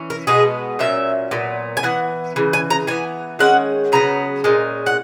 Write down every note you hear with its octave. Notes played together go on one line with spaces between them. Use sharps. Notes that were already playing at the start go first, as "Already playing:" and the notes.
Already playing: E3 C#4
A#4
B2 G#3 B3 G#4
A#2 F#3 C#4 E5
A#2 F#3 B3
G#5
E3 B3 F#5
C#3 E3
G#5
A#5
E3 B3 G#5
D#3 G#3 C#4 F#5
C#3 F#3 B3 A#5
A#2 G#3 C#4
F#5